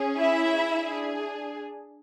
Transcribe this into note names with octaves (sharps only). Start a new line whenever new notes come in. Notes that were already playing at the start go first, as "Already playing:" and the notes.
Already playing: C#4 G#4
E4 E5
D4 G#4